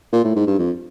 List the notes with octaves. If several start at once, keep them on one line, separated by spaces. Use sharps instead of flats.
A#2
A2
G#2
G2
F2